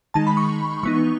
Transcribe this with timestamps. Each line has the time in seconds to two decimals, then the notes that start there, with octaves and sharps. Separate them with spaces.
0.14 D#3 G#3 D#4 A5
0.27 B5
0.37 C#6
0.83 E3 B3 D#4 C#6